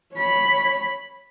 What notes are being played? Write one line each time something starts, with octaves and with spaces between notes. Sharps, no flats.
C#5 B5